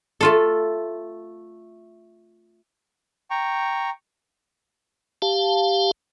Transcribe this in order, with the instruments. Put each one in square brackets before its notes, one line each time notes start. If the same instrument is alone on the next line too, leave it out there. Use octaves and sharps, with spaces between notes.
[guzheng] A3 F4 A4
[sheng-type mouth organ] G5 A#5 C#6
[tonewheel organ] G4 F5 A5